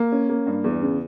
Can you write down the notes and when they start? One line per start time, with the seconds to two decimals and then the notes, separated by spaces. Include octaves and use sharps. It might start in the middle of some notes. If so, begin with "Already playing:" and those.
Already playing: A#3
0.12 C#4
0.29 A#3
0.47 G2
0.64 E2
0.82 C#3